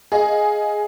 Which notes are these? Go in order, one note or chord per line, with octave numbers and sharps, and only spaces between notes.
G#4 D#5 F5